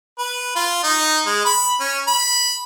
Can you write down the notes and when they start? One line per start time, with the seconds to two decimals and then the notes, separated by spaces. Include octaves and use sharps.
0.18 B4
0.56 F4
0.83 D#4
1.26 G#3
1.45 B5
1.80 C#4
2.07 B5